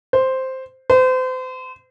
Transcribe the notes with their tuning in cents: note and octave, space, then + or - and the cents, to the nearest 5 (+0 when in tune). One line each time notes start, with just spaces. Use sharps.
C5 +0
C5 -35